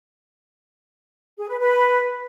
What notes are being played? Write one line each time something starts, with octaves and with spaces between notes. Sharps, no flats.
G#4
B4
B4